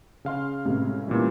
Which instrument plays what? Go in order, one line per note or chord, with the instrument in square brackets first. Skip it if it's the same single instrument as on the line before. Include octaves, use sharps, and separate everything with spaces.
[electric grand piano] C#3 F5 C6
[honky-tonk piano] C#2 A2 C3
[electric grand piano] A#2 E3 G3